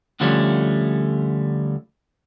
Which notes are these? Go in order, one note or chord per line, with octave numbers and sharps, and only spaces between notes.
D2 D3 F3 G3 A3 C#4